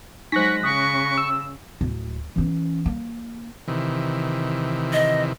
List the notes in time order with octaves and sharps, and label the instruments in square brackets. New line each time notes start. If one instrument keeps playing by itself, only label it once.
[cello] F#3 G#3 [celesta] D#4 C5 [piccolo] C#6 [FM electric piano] F#6 A#6 B6
[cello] C#3 [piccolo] C#6 [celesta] D#6
[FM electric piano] E6
[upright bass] D1
E3 C#4
A#3
[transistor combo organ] C3 D#3 E3
[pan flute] D#5